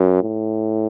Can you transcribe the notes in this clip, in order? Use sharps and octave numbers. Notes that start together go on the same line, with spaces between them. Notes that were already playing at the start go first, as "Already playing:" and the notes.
Already playing: F#2
A2